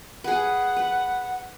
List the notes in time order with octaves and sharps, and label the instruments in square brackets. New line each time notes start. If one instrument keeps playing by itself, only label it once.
[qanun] G#4 B4 [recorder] F#5
[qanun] B4